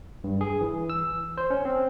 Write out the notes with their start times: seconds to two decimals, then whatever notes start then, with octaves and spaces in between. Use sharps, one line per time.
0.24 G2
0.41 G#4
0.61 E3
0.90 E6
1.38 C5
1.50 C#4
1.65 C4